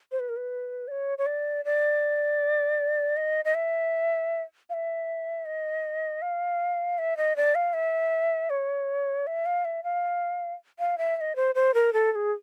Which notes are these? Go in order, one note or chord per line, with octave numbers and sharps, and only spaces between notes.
C5
B4
A#4
B4
D5
C#5
C#5
D5
D5
D#5
D#5
E5
F5
E5
D#5
F5
E5
D#5
D5
F5
E5
C#5
E5
F5
E5
F5
F5
E5
E5
D#5
C5
C5
A#4
A4
A4
G#4